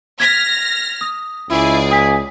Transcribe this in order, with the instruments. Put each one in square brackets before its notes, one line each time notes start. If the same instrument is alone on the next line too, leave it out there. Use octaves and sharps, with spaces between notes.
[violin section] F6 A#6 [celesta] G#6 B6
[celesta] D#6
[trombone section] C#2 [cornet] E4 [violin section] G#4 D5
[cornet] G#5 [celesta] D#6 B6